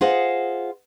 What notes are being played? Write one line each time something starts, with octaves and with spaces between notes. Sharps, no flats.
F4 G#4 C5 D#5 F#5